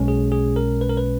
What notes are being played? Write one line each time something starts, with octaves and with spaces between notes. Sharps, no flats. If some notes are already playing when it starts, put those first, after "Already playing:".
Already playing: B1 B2 G#3 C#4
G#4
G#4
A#4
B4
A#4
B4